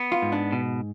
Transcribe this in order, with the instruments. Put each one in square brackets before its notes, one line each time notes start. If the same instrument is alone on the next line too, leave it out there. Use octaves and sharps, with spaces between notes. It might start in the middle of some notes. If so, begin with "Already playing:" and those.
Already playing: [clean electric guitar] B3
[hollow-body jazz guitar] F4
[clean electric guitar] G#2
[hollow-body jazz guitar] D4
[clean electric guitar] B2